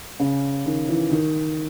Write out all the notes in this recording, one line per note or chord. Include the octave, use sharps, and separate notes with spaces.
C#3
D#3
E3
D#3